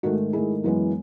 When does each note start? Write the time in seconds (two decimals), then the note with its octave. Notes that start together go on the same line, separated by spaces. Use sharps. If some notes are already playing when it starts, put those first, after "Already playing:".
0.03 G#2 D#3 A3 D#4 F#4
0.33 G#2 D#3 A3 E4 G#4
0.63 F#2 E3 G#3 B3